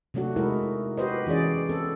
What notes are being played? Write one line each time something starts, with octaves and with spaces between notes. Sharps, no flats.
C3 F#3 A3 D4 F#4
G#3 D#4 E4 A#4
F#4 G4 B4 C5 D#5
E3 C#4 G#4 D5
C4 A4